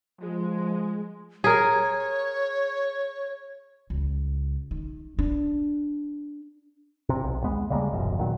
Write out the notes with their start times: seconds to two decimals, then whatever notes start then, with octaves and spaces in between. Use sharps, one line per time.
0.21 F3 G#3
1.44 G#4 A#4 C#5
3.90 C#2
4.71 D#3
5.19 D4
7.09 C3
7.24 B1
7.44 D#2 G#3 B3
7.70 C#3 G3 G#3 A#3
7.92 D#1 A1 F#2 B2
8.18 A#2 D#3 F#3